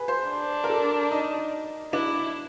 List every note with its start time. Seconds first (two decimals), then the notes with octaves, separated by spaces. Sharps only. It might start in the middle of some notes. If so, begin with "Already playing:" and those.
Already playing: G#4 B4
0.08 C5
0.29 D4
0.64 A#4
0.70 A4
1.11 D#4
1.93 D4 E4